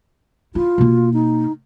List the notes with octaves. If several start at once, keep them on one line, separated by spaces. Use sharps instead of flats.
E4 F4
B2 A#3
D#4